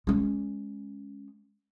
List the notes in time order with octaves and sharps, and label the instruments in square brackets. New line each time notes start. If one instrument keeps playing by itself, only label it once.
[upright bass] G#3 C#4